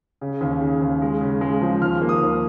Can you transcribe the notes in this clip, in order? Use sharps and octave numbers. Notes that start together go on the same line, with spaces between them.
C#3
D#2
C#3
D#2
G#3
C#3
G#3
F3
D#2 F6
A#3
D#6
D#2